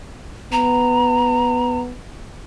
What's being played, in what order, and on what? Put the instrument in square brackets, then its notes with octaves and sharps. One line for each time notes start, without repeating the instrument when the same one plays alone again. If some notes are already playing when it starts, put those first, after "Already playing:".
[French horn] B3 [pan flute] A#5